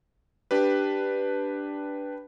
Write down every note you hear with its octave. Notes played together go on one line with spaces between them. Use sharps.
D4 G4 B4